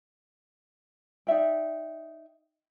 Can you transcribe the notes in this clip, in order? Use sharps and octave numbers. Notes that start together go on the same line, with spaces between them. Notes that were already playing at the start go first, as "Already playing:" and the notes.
D#4 D5 E5 G5